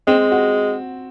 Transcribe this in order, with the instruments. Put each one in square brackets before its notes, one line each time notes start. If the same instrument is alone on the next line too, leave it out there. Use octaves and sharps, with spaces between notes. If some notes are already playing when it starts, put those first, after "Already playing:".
[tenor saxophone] G#3 [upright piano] C4
[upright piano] F#4